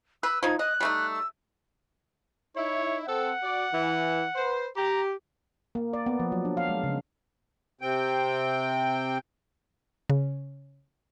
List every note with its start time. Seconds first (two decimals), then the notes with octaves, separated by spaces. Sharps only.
0.23 B4 E6
0.43 F3 D#4 G#6
0.59 D#5 F#6
0.80 G3 A3 D#4
1.13 E6
2.56 D#4 E4 C#5
3.08 C4 A4 F#5
3.43 F#4 D5
3.72 E3
4.35 B4 C5
4.76 G4 A#5
5.75 A#3
5.93 D5
6.06 B3
6.20 F3
6.32 F#3
6.45 D4
6.57 F5
6.69 G#3
6.84 C#3
7.81 C3 C4 G5
10.10 C#3